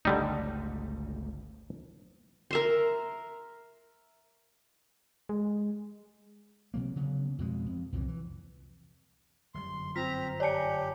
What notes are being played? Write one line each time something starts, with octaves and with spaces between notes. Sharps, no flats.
G1 C#2 D3 G3 A3 D#4
A#4 E5 C6
G#3
C3 F#3 A#3
C#3 F#3 B3
F2 B2 G#3
F2
C2 F2 A#2 E3
E3
G1 F#2 G3 C6
C4 F4 A#5 F6 B6
G4 C#5 D5 G#5 A5 C#7